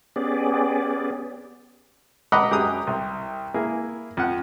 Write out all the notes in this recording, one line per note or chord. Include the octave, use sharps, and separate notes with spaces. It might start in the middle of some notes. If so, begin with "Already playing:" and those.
B3 C#4 G4 G#4 D5
D#5 F#5 A#5 B5 D6 D#6
F#2 G4 G#4 A#5 D#6
C2
A#3 E4 G#4
F2 F#5